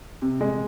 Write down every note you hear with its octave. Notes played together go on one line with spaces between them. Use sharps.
C3
G#3